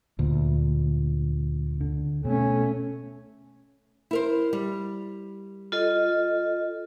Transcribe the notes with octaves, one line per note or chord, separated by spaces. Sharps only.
D2 A#2
D3
B2 A3 C#4
E4 A#4 C5
G3
F4 A4 D#5